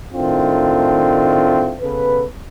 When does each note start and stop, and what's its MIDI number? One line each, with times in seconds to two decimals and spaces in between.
0.13 1.75 45
0.13 1.75 51
0.13 1.75 57
0.13 1.75 60
0.13 1.75 62
0.13 1.75 65
1.81 2.25 49
1.81 2.25 59
1.81 2.25 69
1.81 2.25 71